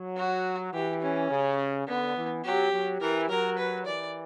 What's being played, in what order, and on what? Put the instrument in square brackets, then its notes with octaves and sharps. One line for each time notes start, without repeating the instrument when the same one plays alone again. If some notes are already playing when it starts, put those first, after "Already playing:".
Already playing: [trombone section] F#3
[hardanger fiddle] F#4
[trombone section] E3 [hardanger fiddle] G4
[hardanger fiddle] C#4
[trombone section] C#3
[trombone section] D3 [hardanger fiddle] B3
[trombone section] E3
[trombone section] F#3 [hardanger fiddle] G4
[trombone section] F#3
[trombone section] E3 [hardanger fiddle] A#4
[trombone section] F#3 [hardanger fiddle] A#4
[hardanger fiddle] B4
[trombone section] E3 [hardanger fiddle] D5